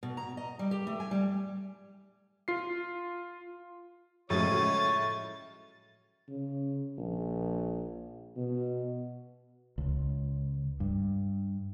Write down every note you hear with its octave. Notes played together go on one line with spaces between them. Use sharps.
B2
A#5
D#5
G3
G4
A3
G#5
G3
F4 C7
A2 C#3 F3 F#3 G#3 A3 C#5 A6
C#3
A#1
B2
C#2
G2